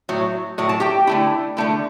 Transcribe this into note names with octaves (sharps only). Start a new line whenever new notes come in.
A2 F#3
A2 F#3
A5
G4 G5
D3 A3 E4
D3 A3 E4